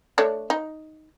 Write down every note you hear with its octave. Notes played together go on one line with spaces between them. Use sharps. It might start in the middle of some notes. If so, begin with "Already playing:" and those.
A3 D4 C#5
D#4